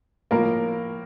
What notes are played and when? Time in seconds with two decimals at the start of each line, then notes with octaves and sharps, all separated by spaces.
0.31 A2 F3 A#3 A#4